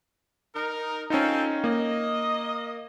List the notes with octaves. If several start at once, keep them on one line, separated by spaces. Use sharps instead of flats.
D#4 A#4
C4 C#4 D#4 F4 A4
A#3 D#5